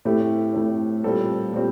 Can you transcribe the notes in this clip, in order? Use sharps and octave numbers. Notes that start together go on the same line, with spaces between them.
A2 A3 C4 G4
A2 A3 C4
A#2 G3 C4 A4
A#2 G3 C4